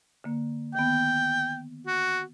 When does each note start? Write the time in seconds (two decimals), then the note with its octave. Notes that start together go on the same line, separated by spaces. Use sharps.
0.24 D3 A#3
0.75 D#3 B3 G5
1.87 F#4